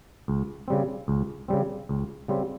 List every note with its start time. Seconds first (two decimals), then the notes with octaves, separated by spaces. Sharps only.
0.28 C#2
0.68 C#3 G3 C4
1.08 C#2
1.48 C#3 G3 C4
1.89 C#2
2.28 C#3 G3 C4